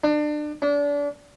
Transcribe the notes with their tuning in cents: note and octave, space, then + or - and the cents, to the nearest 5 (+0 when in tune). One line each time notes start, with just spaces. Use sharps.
D4 +30
D4 -30